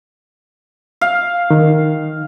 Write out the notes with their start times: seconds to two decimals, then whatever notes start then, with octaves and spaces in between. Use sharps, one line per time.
1.01 F5
1.50 D#3